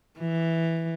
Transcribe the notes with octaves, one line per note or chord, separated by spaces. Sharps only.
E3